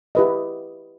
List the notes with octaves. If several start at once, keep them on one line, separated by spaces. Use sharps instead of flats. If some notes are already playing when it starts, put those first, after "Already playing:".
E4 G4 B4 D#5